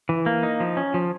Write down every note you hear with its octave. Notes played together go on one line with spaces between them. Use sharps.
E3
A#3
D#4
F3
C#4
F3